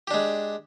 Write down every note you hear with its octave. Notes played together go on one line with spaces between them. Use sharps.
G#3 D4 G4